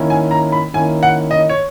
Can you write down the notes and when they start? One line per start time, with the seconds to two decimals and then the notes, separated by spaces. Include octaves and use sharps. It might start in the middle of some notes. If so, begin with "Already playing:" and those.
Already playing: D#3 A#3 C#4 E4
0.10 G#5
0.31 A#5
0.52 B5
0.74 D#3 A#3 C#4 E4 G#5
1.03 F#5
1.31 D#5
1.49 C#5